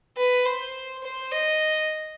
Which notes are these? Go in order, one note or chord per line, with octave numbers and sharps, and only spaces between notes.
B4
C5
C5
D#5